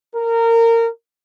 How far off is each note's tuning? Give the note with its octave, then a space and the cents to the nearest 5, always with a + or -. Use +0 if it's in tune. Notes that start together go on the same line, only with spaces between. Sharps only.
A#4 -20